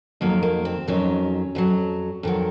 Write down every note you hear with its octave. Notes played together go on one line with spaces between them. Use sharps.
F2 D#3 F#3 A#3
A#3
C4
F2 D#3 F#3 C#4
F2 D#3 F#3
F2 D#3 F#3